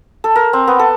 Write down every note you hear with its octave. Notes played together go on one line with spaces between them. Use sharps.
A4
A#4
C4
B3
A4